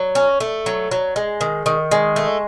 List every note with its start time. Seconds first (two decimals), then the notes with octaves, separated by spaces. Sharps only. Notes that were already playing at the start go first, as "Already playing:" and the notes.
Already playing: F#3
0.15 C#4
0.40 A3
0.66 F#3
0.91 F#3
1.16 G#3
1.41 D#3
1.66 D#3
1.91 G#3
2.16 A3